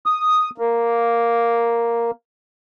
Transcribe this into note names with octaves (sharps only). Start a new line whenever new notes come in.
D#6
A#3